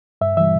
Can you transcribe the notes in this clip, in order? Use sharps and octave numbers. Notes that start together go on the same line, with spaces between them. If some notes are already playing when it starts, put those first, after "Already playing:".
G2 E5
E3 G3 E5